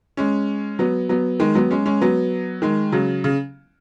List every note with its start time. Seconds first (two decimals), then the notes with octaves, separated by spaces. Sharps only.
0.17 G#3 C#4
0.79 F#3 B3
1.09 F#3 B3
1.40 D#3 G#3
1.55 F#3 B3
1.71 G#3 C#4
1.86 G#3 C#4
2.01 F#3 B3
2.62 D#3 G#3
2.92 C#3 F#3
3.24 C#3